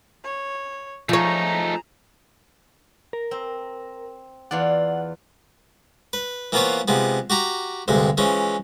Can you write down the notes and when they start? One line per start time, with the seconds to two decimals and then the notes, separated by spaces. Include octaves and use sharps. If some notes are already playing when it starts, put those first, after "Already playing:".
0.24 C#5
1.09 F3 A3 D#4 G#4 C#5 A#5
3.13 A#4
3.31 C4
4.51 E2 F4 D5 F#5
6.13 B4
6.52 E3 A#3 B3 F4 C5 C#5
6.88 C3 F3 G#3 B3
7.30 F#4 G4 A#5
7.88 D2 G2 C3 G#3
8.18 E3 F3 G#3 C#4